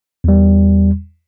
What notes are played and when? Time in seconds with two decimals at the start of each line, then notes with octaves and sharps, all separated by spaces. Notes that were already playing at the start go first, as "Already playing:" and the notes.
0.24 E2 G3